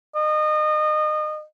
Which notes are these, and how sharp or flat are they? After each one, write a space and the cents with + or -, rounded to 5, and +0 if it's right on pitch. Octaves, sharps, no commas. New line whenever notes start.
D#5 -30